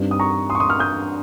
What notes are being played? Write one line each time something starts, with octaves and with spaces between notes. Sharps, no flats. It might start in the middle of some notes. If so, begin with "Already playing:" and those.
Already playing: G2 G3 C4 D#4
D#6
A#5 C#6
C6 D#6
C#6
C6 D#6
C#6 F6
D#6 G6